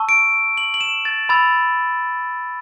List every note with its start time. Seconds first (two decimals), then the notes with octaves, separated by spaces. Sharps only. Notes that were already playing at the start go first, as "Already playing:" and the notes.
Already playing: A5 C#6 E6
0.09 D7
0.57 F#7
0.74 F#7
0.81 E7
1.05 A6
1.29 B5 E6 A6